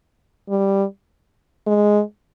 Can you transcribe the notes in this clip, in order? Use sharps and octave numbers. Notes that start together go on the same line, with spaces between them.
G3
G#3